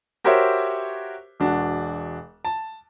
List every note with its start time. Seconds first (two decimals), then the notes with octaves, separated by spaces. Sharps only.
0.24 F#4 G4 A#4 C5 C#5 E5
1.40 E1 D4 F#4
2.45 A5